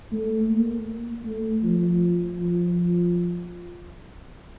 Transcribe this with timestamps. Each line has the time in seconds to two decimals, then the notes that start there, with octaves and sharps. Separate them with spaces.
0.12 A3
0.50 A#3
1.25 A3
1.63 F3
2.39 F3